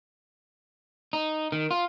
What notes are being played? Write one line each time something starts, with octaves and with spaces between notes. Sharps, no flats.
D#4
D#3
F4